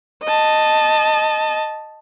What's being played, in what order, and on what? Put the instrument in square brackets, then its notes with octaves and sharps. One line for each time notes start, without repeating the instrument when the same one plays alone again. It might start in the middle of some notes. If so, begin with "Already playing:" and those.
[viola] D#5 A5